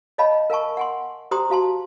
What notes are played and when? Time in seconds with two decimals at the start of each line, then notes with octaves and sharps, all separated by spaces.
0.18 C#5 D#5 F5 A5 B5
0.50 A#4 F5 G#5 A5 C#6
0.77 F#5 G#5 C6
1.31 G4 C5 G5 A#5 C6 D#6
1.50 F#4 F5 A5 C6